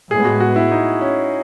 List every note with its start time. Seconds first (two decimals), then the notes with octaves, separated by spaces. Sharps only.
0.11 A2 G#3 B3 G#4
0.25 F#4
0.40 F#4
0.56 E4
0.71 D#4
1.01 C#4